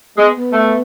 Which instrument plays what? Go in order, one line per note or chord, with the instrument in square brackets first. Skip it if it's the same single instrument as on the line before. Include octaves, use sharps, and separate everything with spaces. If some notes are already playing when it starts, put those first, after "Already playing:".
[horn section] G#3 [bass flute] B3
[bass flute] B3
[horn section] A3